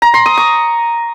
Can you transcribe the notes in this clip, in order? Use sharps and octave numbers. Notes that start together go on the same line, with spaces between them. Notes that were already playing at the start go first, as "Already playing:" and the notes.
A#5
C6
D#6
C#6